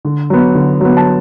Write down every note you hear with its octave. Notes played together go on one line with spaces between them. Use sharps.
D3
F#3 B3
D3
F#3 B3
A5